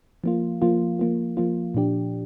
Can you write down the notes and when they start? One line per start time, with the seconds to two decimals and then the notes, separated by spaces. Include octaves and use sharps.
0.24 F3 A#3 F4
0.62 F3 A#3 F4
0.99 F3 A#3 F4
1.37 F3 A#3 F4
1.74 A#2 F3 D4 G4